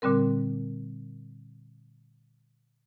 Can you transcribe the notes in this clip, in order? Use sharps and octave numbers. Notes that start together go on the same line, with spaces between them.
A#2 D3 G3 C4 A#4